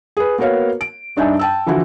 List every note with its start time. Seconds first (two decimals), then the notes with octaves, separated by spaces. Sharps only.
0.17 G#4 B4
0.38 A#3 B3 F#4 A#4 C#5 F5
0.81 D7
1.17 G2 D4 D#4 E5 G#5
1.39 G5 A5 E6
1.66 D3 E3 F3 E4 F#4